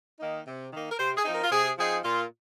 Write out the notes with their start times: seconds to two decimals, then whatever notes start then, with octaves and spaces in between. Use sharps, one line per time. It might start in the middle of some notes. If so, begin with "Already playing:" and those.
0.20 D#3 A#3 D#4
0.47 C3
0.72 D#3 A#3 D#4
0.90 A#4
0.98 C3 C5
1.17 G#4
1.25 F3 C4 D#4
1.34 A#4
1.44 F4
1.51 C3 G#4
1.77 F3 C4 D#4 G#4
2.04 A#2 F4